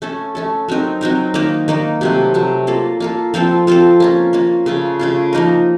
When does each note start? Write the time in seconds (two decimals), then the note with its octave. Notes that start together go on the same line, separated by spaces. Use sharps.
0.02 A3 C#4 A4
0.35 A3 C#4 A4
0.68 F#3 C4 D#4 A#4
1.01 F#3 C4 D#4 A#4
1.34 D#3 A#3 D#4
1.68 D#3 A#3 D#4
2.01 C3 F#3 A3
2.34 C3 F#3 A3
2.67 A#3 F4 A4
3.00 A#3 F4 A4
3.34 F3 C4 F4 A4
3.67 F3 C4 F4 A4
4.00 A#3 C#4 F4
4.33 A#3 C#4 F4
4.66 C#3 A3 C#4 F4
4.99 C#3 A3 C#4 F4
5.33 F3 A#3 D#4 A#4